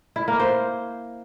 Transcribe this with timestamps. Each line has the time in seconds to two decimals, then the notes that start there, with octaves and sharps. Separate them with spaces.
0.16 E4
0.28 A#3
0.40 C5